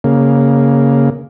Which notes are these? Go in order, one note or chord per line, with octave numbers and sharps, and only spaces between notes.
C#3 A#3